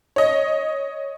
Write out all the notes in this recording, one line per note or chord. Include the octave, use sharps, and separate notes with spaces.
C#5 D#5